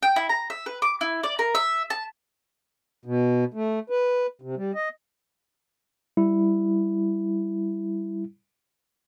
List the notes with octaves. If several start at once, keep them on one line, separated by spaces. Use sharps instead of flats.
G5
E4
A#5
E5
B4
D6
E4
D5
A#4
E5
A5
B2
A3
B4
C3
G3
D#5
G3 E4